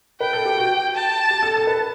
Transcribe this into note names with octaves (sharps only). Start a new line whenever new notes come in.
B4 G5
A4
G4
F#4
A5
G4
A4
A4
B4